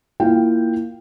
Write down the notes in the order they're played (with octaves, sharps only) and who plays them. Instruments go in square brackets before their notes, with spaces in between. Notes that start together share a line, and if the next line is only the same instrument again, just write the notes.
[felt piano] A#3 E4 F4 F5 G5